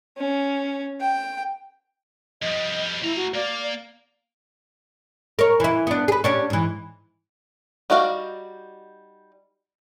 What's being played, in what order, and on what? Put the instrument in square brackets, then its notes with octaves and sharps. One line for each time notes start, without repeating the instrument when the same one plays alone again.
[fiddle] C#4
G5
[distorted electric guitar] F2 G3 [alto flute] D#5
[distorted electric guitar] A3 A#5 [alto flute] E4
[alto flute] F#4
[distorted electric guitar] A#3 [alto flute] D5
[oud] A#4 C#5
E3 E4
B3 D4
G#4 B4
C#4 D4 G4
G#2 E3
[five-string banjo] G3 D#4 F#4 D5 F5